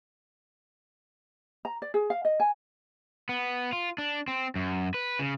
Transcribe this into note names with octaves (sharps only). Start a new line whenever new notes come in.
A#5
D5
G#4
F5
D#5
G#5
B3
F4
D4
C4
F#2
B4
C#3